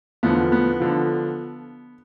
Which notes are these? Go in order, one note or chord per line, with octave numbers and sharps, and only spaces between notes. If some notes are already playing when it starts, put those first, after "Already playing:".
E2 D3 F3 B3
B3
D3 F3